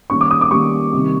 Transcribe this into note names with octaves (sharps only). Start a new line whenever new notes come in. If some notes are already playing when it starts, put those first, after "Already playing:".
D#3 G3 A#3 C#4 C#6
D6
D#6
D6
D#3 G3 A#3 C#4 C#6
C3 D#3 G3